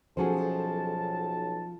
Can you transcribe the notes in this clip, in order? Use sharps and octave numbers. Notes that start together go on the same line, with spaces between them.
B1 F3 C#4 F#4 G#4 A4 C5 A5